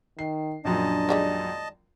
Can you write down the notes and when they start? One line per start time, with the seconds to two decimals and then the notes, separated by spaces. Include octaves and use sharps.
0.19 D#3 C7
0.65 A#1 F#2 A#2 D4 D#5 A5
1.09 D#3 G3 G#3